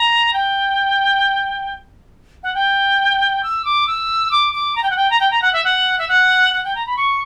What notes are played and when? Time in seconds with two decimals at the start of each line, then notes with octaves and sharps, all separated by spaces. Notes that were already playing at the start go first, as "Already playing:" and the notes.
Already playing: A#5
0.33 G5
2.43 F#5
2.54 G5
3.43 E6
3.65 D6
3.87 E6
4.31 D6
4.53 D6
4.76 A#5
4.83 G5
4.90 F#5
4.97 G5
5.10 A#5
5.20 G5
5.31 A#5
5.42 F#5
5.53 E5
5.64 F#5
5.99 E5
6.08 F#5
6.53 F#5
6.64 G5
6.75 A#5
6.86 B5
6.97 C#6